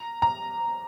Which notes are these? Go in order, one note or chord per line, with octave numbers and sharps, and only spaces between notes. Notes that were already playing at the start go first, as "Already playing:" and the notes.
Already playing: A#5
A#5